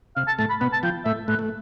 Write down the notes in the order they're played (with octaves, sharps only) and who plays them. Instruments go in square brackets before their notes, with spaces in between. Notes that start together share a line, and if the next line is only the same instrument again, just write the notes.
[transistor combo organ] C3 [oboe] F5
[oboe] A5
[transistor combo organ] A2 A3 [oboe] A5
[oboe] B5
[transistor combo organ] B2 B3 [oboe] B5
[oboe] A5
[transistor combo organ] F3 F4 [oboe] G5
[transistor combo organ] A2 A3 [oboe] E5
[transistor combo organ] A2 A3 [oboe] B4
[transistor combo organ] A3